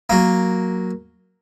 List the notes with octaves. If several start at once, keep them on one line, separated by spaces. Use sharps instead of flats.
F#3 A#3